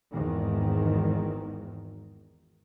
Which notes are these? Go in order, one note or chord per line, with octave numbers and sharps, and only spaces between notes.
G#1 E2 G#2 D#3